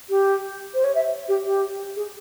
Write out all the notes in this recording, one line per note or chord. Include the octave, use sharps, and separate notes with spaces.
G4
C5
C#5
E5
G4
G4
G#4